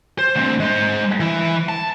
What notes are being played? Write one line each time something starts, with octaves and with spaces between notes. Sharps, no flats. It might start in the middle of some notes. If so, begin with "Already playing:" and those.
C5
D2 C4
G#3 C5
E3 E4
A5